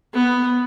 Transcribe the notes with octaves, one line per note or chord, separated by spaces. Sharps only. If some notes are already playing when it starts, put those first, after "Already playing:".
B3